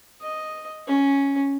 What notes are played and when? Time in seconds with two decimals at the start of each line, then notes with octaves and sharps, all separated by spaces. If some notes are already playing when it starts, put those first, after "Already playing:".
0.22 D#5
0.87 C#4